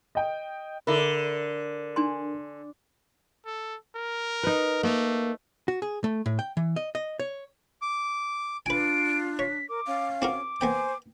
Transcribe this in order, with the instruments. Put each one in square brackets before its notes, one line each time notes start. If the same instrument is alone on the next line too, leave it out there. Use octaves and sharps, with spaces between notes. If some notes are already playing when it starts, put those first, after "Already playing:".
[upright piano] D#5 G5
[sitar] D3 [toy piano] A4 E5 B5 [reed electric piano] A#4
[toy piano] D4 G#5 C6
[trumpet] A4
A#4
[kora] D#4 B4
[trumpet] A3 [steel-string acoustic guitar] A#3
[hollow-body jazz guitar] F#4
G#4
A3
A2
G5
E3
D#5
D#5
C#5
[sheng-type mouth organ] D6
[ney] D4 [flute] F4 [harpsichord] B4 G#5 [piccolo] D7
[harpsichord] C#5 [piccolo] B6
[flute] A#4 [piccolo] D6
[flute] C#4 [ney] F5
[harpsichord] C4 F#4 A#4 [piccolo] D6
[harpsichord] A#3 B3 G5 [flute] C5 [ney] G#5